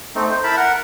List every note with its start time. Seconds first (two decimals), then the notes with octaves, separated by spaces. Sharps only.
0.15 A3 C4 D#4
0.30 C5
0.43 E4 A#4 A5 B5
0.57 A#4 F#5